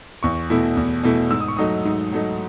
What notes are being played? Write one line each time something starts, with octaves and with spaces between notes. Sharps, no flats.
E2 C#6
B2 A3 E4
E2
B2 A3 E4
G#2 E6
D#6
C#6
F#3 A3 D#4 D#6
G#2
F#3 A3 D#4